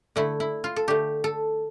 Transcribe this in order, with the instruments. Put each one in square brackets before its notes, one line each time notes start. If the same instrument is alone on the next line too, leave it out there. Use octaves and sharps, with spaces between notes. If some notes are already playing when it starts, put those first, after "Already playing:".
[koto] D3 A3 E4
E4
F4
A4
D3 A3 G4
A4